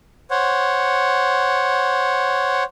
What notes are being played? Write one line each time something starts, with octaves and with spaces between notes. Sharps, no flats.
C5 C#5 F#5